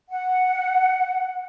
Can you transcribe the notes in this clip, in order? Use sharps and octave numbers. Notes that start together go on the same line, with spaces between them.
F#5